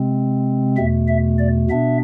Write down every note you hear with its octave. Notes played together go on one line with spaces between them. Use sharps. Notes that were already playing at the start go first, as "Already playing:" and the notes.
Already playing: C3 G#3 C4
E2 B2 A3 E5
E5
D5
B2 B3 D4 E5